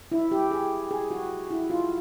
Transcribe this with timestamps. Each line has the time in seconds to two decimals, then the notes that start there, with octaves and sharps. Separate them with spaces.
0.12 E4
0.31 G4
0.51 G#4
0.91 G#4
1.11 F#4
1.51 E4
1.70 F4